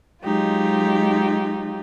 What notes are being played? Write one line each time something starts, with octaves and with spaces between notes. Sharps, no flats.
F#3 G#3 D#4 F4 G4